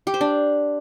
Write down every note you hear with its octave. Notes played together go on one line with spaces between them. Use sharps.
G4
C5
D4